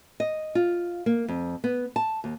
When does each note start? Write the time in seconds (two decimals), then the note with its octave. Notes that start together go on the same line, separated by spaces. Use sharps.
0.20 D#5
0.55 F4
1.06 A#3
1.28 F2
1.64 B3
1.96 A5
2.24 D#2